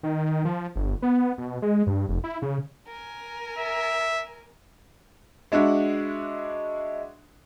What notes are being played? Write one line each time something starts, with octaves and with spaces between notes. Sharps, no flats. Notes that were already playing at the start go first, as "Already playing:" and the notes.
D#3
D#3
F3
G1
B3
B2
G#3
G2
F1
E4
C#3
A#4 G#5
E5
G#3 D4 E4 F#4